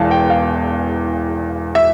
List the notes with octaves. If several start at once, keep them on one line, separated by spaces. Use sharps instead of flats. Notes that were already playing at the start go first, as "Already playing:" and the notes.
Already playing: E1 E2 E3 F5 A5
G5
F5
E5